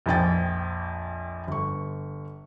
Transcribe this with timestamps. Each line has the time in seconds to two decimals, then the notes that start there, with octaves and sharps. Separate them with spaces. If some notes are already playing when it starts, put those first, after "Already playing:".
0.06 A#1 F2 G5 A6
1.47 G1 C#6